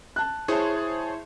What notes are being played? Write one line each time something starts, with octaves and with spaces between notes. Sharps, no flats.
A5 F#6
E4 G#4 C5 C#5 A5